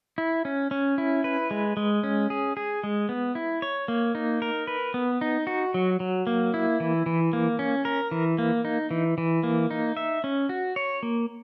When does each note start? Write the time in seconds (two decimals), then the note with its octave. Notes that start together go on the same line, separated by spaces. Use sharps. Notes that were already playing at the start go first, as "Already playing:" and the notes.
0.18 E4
0.45 C#4
0.71 C#4
0.98 E4
1.24 B4
1.51 G#3
1.77 G#3
2.03 C#4
2.30 G#4
2.57 G#4
2.84 G#3
3.09 B3
3.35 E4
3.62 C#5
3.88 A#3
4.15 D#4
4.42 A#4
4.67 B4
4.94 B3
5.21 D#4
5.47 F#4
5.74 F#3
6.00 F#3
6.27 A#3
6.54 E4
6.80 E3
7.06 E3
7.33 A#3
7.59 C#4
7.85 A#4
8.11 E3
8.38 A#3
8.65 D#4
8.91 E3
9.18 E3
9.43 A#3
9.70 D#4
9.97 E5
10.24 C#4
10.49 F#4
10.76 C#5
11.03 A#3